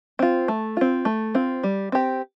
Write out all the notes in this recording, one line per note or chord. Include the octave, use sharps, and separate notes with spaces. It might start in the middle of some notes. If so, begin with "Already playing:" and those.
C4 F4
A3
C4 F4
A3
C4 F4
G3
C4 G4